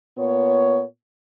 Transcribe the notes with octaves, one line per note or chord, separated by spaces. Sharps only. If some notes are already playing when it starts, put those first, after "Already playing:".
A#2 B3 C#5